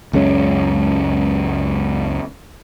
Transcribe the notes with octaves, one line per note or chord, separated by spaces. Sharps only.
C#2 F#2 G#3 C#4